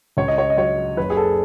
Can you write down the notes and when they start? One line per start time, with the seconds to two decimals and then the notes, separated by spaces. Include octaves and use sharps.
0.17 C#2 C#5
0.28 D#5
0.38 C#5
0.50 D#5
0.57 F#3 C#5
0.97 F#1 B4
1.10 G#4
1.17 A4